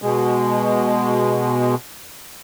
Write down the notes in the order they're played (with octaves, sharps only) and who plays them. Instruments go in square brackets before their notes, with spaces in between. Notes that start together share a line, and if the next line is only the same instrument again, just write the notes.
[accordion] B2 G#3